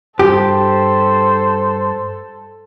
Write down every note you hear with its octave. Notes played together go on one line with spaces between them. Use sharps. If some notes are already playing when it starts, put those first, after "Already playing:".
G2 G4 A4 C5